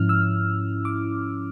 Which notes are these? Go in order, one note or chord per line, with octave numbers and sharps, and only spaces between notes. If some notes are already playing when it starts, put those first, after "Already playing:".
Already playing: G#2 F3 C#4 E4 F6
E6
D6